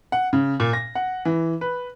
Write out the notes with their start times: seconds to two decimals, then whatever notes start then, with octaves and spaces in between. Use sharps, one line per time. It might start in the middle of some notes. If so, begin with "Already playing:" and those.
0.12 F#5
0.33 C#3
0.60 A#2
0.73 A#6
0.95 F#5
1.25 E3
1.61 B4